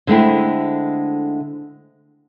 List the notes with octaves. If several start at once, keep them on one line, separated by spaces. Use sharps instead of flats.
D3 G#3 A3 C4 E4